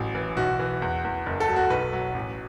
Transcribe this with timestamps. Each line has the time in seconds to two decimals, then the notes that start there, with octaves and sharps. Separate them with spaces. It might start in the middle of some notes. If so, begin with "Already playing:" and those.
Already playing: A1 F#3
0.15 E3
0.37 B1 F#4
0.59 E3
0.82 E2
1.04 E2
1.26 F#1
1.40 A4
1.49 F#3
1.56 F#4
1.70 B1 B4
1.93 F#3
2.14 A1